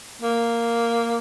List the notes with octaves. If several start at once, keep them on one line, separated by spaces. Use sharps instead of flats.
A#3